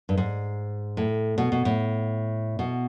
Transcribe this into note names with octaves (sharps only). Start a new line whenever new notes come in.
G2
G#2
A2
B2
B2
A2
B2